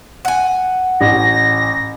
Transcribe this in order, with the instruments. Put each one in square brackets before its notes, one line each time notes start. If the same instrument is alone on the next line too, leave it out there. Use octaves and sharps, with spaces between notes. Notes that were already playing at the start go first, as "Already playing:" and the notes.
[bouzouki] F#5 G#5
[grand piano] A1 [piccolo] A#6